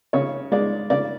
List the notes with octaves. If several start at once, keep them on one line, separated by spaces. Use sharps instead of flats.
C#3 C#5
G#3 D5
C#3 D5